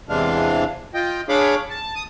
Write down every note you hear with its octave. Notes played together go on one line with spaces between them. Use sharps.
E2 C3 E3 G#3 D4 F5
F4 D#5 G5
D4 G#4 C#5 F5 B5 D6
A5
D#6